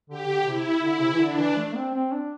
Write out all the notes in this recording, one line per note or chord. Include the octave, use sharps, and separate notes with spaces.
D3 G4
D3
C3 E4
D3 E4
C3
E3
D3 D4
E3
A3
C4
C4
D4